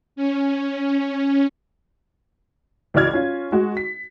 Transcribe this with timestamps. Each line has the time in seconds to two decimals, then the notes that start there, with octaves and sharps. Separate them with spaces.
0.16 C#4
2.94 C#2 E3 F#4 D5 F6 G#6
3.13 C#4 F4
3.52 G#3 F#4
3.77 B6